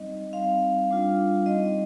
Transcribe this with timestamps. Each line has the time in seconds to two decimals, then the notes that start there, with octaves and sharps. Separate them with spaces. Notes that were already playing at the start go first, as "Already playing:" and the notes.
Already playing: G3 C4 D#4 D#5
0.33 G3 C4 D#4 F5
0.90 G3 D4 F4
1.46 G3 C4 D#4 D#5